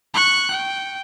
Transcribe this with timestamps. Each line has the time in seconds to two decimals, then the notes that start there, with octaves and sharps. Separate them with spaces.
0.14 C#6 F#6
0.51 G5